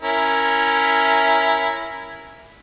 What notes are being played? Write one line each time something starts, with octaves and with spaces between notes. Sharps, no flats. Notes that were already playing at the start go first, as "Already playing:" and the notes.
C#4 E4 A#4